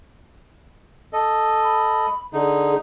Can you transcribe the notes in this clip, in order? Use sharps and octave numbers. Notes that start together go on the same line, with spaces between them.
A4 D#5
B5
D3 D#4 G#4